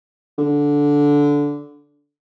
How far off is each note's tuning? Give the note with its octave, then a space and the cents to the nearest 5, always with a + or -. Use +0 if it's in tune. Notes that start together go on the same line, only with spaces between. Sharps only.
D3 -15